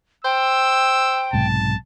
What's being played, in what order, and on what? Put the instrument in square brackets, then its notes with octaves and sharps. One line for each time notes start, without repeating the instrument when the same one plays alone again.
[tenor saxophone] C5 [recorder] G5 [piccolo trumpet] E6
[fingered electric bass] B1 G#2 C3 [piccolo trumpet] A5